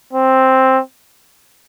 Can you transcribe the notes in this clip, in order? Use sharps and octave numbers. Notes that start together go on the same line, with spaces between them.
C4